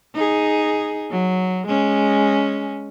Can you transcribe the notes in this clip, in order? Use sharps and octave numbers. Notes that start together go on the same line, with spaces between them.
D#4 G#4
F#3
G#3 C#4